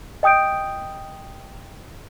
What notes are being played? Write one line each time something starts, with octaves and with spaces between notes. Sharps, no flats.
D#5 G5 D#6 G6 D7